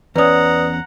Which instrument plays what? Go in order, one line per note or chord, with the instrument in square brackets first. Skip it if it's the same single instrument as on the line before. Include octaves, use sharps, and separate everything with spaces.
[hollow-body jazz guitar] E2 C#4 [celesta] B4 D5 D#6 [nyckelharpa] F#5 A#5